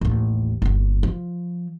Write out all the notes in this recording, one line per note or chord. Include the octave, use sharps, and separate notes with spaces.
A1 D#2
G1 D#2
F3